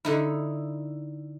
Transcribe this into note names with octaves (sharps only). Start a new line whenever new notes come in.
D3 D#4 E4